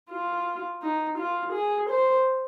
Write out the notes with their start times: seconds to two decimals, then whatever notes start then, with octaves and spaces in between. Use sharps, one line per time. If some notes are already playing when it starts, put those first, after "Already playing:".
0.10 F4
0.82 D#4
1.18 F4
1.53 G#4
1.90 C5